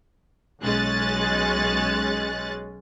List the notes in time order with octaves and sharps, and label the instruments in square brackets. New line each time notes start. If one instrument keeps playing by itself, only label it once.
[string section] B1 G#3 C#4 F#6 A6